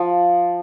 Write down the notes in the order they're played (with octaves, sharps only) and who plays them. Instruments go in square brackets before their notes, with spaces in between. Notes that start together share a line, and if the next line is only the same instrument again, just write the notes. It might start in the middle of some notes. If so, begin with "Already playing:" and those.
Already playing: [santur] F3